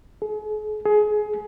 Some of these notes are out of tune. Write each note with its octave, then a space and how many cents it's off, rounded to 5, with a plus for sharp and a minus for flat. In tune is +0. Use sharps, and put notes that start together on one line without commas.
G#4 +45
G#4 +25